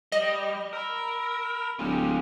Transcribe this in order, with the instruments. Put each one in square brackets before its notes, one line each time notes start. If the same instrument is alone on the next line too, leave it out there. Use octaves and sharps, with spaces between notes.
[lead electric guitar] G3 [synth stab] D#5
[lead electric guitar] A#4 [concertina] B5 E6
[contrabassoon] D1 [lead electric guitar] C#4 F4 [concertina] G4 G#4